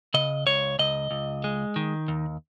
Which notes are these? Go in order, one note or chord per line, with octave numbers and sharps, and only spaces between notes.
C#3 D#5
C#2 C#5
C#2 D#5
C#2
G#3
D#3
D#2